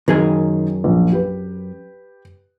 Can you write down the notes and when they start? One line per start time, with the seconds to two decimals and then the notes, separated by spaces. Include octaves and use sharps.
0.08 F#2 D#3 G#4 G#5
0.84 A#1
1.12 G4 B4